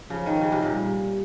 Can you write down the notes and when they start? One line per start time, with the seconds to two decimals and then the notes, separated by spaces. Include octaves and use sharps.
0.10 C#3 F3
0.26 D#3
0.41 C#3
0.52 C3
0.63 A#2
0.72 G3